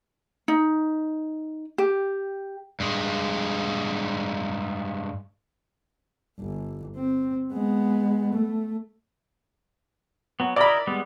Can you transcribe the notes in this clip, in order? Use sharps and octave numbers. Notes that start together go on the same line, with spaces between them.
D#4
G4
G2 G#3
G1
C4
G#3 B3
A3
F#3 B3
E4 A#4 D5 D#5 B5
G3 G#3 B3